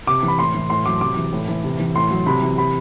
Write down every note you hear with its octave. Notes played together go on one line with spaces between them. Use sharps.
C3 D6
E3
B5
A2 C6
E3
A2 C6
F#3 D6
C3 D6
E3
A2
E3
C3
E3
A2 C6
F#3
C3 B5
E3
C3 B5